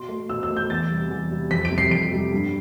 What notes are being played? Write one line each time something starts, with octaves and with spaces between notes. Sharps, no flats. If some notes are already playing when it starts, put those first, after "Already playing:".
Already playing: B2 C6
A3
B2 E6
E6
A3
G6
E2 A6
C3 G3
E2
C3 G3
F2 B6
D7
C3 G3
C7
F2 D7
C3 G3
G2